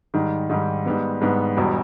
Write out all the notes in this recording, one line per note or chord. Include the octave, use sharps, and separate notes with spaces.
G#2 D#3 G3
G#2 D#3 G3
G#2 G3 B3
G#2 G3 B3
E1 E2 B2 G3